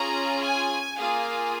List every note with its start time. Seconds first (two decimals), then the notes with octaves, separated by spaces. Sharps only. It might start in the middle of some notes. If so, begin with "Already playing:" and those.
Already playing: C#4 F4 G#4 A#5
0.42 G#5
0.97 A#3 F4 G#4 F5